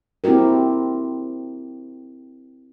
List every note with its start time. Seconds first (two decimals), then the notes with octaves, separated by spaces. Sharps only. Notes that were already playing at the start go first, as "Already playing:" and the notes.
0.24 C4 E4 F#4 G4 A#4